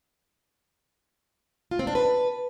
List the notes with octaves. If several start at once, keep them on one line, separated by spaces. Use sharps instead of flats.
F4
C4
D4
B4